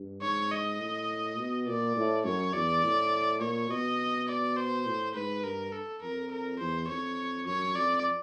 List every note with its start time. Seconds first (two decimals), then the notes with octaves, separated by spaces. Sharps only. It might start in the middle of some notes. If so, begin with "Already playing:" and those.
Already playing: G2
0.22 G#2 C#5
0.51 D#5
0.80 A2
1.38 B2
1.67 A#2 D5
1.97 A2
2.25 F#2 C#5
2.54 E2 D5
2.83 A2
3.41 A#2 C#5
3.70 B2 D#5
4.28 D5
4.56 C5
4.86 A2
5.14 G#2 B4
5.43 G2 A#4
5.72 A4
6.02 F2 A#4
6.31 A#4
6.59 E2 C5
6.88 F2 C#5
7.46 F#2 C#5
7.76 F2 D5